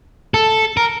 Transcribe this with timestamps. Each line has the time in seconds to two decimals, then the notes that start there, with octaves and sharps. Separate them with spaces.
0.34 A4
0.77 A#4